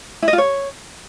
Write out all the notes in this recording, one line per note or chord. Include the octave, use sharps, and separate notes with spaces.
E4
D#5
F4
C#5